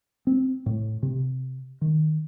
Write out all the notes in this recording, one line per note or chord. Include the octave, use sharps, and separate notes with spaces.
C4
A2
C3
D#3